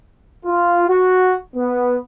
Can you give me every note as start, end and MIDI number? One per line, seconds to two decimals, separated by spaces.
0.45 0.88 65
0.89 1.34 66
1.55 1.96 59